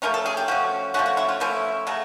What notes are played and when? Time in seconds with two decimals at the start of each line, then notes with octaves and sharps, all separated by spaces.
0.02 F3 A3 C#4 A#4
0.14 A4
0.26 G#4
0.37 G4
0.48 F3 A3 C#4 F#4
0.94 F3 A3 C#4 F#4
1.06 F#4
1.17 E4
1.29 F4
1.40 F3 A3 C#4 E4
1.87 C#3 F#3 A3